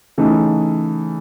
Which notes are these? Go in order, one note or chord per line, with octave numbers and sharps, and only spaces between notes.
C#3 E3 A3 D#4